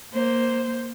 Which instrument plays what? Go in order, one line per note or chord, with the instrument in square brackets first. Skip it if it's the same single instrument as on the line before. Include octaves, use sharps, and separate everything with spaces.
[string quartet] A#3 C5